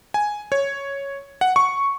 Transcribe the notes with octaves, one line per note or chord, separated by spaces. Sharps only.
G#5
C#5
F#5
C#6